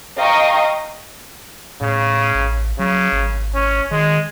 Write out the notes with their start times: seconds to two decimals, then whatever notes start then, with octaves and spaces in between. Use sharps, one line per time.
0.17 D#5 F5 G5 A#5 C#6 D#6
1.81 A2 C#3
2.35 A1
2.79 C#3 F#3
3.12 G#1
3.55 C#4
3.91 D#3 G#3